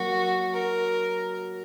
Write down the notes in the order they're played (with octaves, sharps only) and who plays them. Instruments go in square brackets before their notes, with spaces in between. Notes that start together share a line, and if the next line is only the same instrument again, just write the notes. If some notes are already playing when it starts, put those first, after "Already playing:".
Already playing: [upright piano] F#3 A#3 [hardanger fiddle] F#4
[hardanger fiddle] A#4